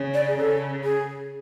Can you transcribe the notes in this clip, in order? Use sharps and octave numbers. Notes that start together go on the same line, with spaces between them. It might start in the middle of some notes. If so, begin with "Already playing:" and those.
Already playing: C#3
D5
G#4
C#3 A4
G#4